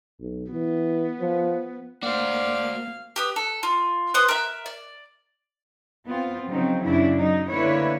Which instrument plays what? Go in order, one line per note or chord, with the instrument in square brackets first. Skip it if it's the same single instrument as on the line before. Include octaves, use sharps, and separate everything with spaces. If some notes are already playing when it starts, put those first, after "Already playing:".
[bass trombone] B1
[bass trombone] E3 [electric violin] B3
[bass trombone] F3
[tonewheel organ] A#3 [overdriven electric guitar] F#4 C5 [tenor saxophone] D5 [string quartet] F5
[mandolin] G4 B4 D#6
A4
F4
B4 C5 C6 D#6
A#4 E5
D5
[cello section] B3 C4 F4
C#3 F3 F#3 C4 D#4
F#2 C#3 D4 E4
F#3 D#4
D3 A#3 E4 B4 C#5